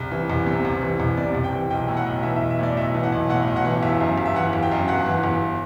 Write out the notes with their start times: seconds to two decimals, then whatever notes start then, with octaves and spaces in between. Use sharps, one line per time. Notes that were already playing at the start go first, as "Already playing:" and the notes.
Already playing: C2
0.11 E3
0.30 C2
0.46 C3
0.65 C2
0.82 E3
1.00 C2
1.17 C3 D5
1.35 C2
1.44 G5
1.53 E3
1.70 B1 G5
1.88 A2
1.97 F#5
2.06 B1
2.23 E3 E5
2.36 E5
2.41 B1
2.50 E5
2.59 A2 D5
2.77 B1 E5
2.94 E3
3.03 F#5
3.12 B1
3.29 A2 F#5
3.47 B1
3.56 F#5
3.65 E3
3.82 G1 E5
4.00 F#2
4.18 G1
4.26 E5
4.35 E3 F#5
4.53 G1
4.63 G5
4.71 F#2
4.88 G1 F#5
5.06 E3
5.24 G1